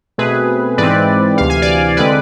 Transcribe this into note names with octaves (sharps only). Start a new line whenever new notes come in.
B2 A3 C4 G#4 B4
G#2 E3 G#3 C4 B4 D5
D2 C3 E3 F5
G#5
D5 F5
D3 G#3 C4 B4 D5